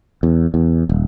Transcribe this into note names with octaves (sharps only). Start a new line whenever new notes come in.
E2
E2
D#1